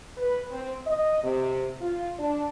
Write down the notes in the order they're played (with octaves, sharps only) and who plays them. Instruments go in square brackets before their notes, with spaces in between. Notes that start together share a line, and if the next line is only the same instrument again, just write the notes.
[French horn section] B4
C4
D#5
C3
F4
D4